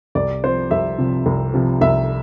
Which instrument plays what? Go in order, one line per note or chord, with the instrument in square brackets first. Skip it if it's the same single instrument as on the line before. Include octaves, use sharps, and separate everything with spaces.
[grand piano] C2 D5
C3 F3 C5
C2 E5
C3 F3
C2
C3 F3
C2 E5